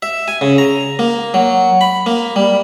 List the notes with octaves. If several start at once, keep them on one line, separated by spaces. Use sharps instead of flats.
E5
G#5
C#3
A#5
A#3
F#3
B5
A#3
G3